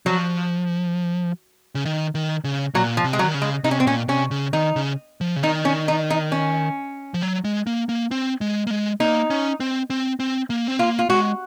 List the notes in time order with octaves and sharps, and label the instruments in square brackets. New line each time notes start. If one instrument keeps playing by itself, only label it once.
[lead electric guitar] F3 [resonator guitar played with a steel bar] F#3
[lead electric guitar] C#3
D#3
D#3
C#3
[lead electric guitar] A#2 [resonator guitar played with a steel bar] F#3
[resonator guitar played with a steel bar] F3
[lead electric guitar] C3
[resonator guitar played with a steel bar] G#3
F#3
[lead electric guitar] D#3
C#3
[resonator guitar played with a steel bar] G#3
[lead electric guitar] C3 [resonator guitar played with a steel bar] D#4
[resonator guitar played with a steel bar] C#4
C4
[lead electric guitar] A#2 [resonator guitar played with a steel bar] C#4
[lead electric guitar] C3 [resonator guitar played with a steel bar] C#4
[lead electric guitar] C#3
[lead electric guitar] D#3 [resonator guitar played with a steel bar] D#4
[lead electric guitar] C#3
F3
C#3
[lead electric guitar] D#3 [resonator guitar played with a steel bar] D#4
[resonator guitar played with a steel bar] C#4
D#4
D#4
C#4
[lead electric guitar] F3
F#3
G#3
A#3
A#3
C4
G#3
A#3
G#3
[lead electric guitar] A#3 [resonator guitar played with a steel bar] D#4
[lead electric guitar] C#4
C4
C4
C4
A#3
C4
[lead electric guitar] A#3 [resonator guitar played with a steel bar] F4
[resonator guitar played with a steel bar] F4
[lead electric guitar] G#3 [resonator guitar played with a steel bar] F#4